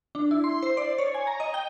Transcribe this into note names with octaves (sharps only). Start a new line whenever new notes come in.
D4
E4
C6
C5
D5
C#5
G#5
A#5
D#5
G5